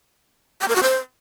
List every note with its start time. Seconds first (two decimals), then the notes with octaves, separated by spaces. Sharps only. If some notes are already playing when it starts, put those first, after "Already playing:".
0.61 G5
0.68 A#4
0.76 F#4
0.83 C5